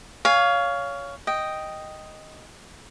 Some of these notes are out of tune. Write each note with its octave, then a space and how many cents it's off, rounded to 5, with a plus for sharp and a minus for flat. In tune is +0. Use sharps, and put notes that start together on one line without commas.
C#5 +25 F5 +0 G#5 -15
D#5 +0 G5 +0